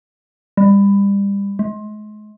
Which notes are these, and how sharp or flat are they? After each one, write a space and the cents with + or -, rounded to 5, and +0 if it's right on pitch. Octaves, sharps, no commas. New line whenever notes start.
G3 +30
G#3 +35